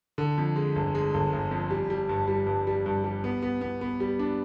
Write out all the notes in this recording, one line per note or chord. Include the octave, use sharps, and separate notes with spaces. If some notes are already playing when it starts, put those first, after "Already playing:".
D3
F2
G#3
G1
G#3
G1
G1
F2
G3
G3
G2
G3
G2
G3
G2
G3
B3
B3
B3
B3
G3
D4